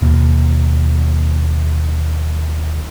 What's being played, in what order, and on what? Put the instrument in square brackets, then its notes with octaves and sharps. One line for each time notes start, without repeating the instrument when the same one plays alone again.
[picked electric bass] D#2 B2 A#3